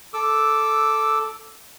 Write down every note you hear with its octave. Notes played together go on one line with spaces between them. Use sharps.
A4 D6 E6